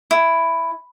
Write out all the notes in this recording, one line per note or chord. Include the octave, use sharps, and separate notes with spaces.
E4